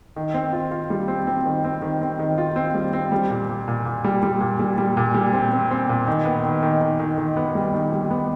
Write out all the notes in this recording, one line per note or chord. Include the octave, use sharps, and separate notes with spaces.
D#3
C4
F4
F4
G3
C4
C4
D#3
C4
D#3
C4
D#3
F4
C4
G3
C4
G3
A#2
A#2
A#2
A#2
G3
G3
A#2
G3
G3
A#2
G3
C4
C4
C4
A#2
D#3
B3
D#3
D#3
D#3
D#3
D#3
B3
G3
D#3
G3
B3